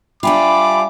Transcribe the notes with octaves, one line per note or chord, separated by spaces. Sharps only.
G3 D4 F4 E5 G5 G#5 B5 D6